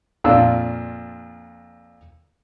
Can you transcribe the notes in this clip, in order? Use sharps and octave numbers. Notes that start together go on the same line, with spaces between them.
F2 A#2 D4 F4 E6